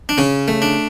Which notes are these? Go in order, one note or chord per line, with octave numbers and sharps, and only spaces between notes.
D4
C#3 C#4
A3
D4